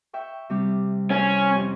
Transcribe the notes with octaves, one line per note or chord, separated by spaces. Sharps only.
E5 G5 C#6
C3 G3 G4
C#4 E4 C5
F2 G4 A#5